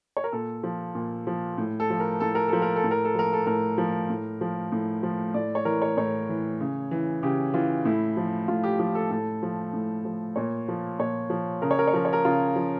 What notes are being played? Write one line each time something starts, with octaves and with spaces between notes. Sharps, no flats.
C#5
A#4
A#2 A4
F3
A#2
F3
A2
A4
F3
A#4
A2 A4
A#4
F3 A4
A#4
A4
A2
A#4
A4
F3 A#4
A4
A2 A#4
F3
A2
F3
A2
F3
A2 D5
C#5
E3 A#4
C#5
A2 C#5
E3
C#3
E3
C#3 G4
E3 F4
A2 E4
F3
A2 F4
G4
F3 G4
A4
A2 A4
F3
A2
F3
A#2 C#5
F3
A#2 C#5
F3
C#3 A#4
C#5
A#4
C#5
F3 A#4
C#5
A#4
C#3 F4
F3